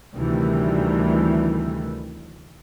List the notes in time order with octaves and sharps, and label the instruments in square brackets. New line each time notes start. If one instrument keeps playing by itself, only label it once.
[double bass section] D2 C3 D#3 E3 G3 A3